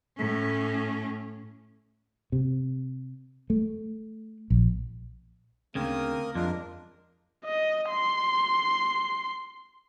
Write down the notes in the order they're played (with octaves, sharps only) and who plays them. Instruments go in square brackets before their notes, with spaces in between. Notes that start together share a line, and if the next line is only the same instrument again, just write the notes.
[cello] A2 C#4
[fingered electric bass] C3
A3
A#1
[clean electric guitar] D2 C#3 [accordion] A#3 A#4 D#6 [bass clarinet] C4
[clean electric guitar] F2 [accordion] G#3 D4 A#4 [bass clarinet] F4
[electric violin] D#5
C6